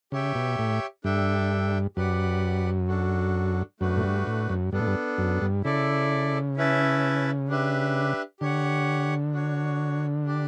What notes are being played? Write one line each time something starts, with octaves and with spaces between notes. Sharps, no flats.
C#3 G4 C#5 E5 G5
B2
A2
G2 D4 A4 E5 G5
F#2 G4 B4 D5 F#5
D4 F#4 A4
F#2 A3 D4 F#4 B4
A2
G2
A2
F#2
G2 B3 D4 A4
A2
G2
F#2
G2
C#3 E4 A4 D5
C#4 E4 B4 E5 A5
D4 G4 B4 E5
D3 G4 C#5 F#5
D4 F#4 C#5
D4 G4 D5 A5